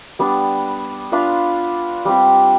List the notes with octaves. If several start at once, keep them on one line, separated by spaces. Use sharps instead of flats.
G3 B3 D4
D4 F4 B4 F5
G3 C4 G4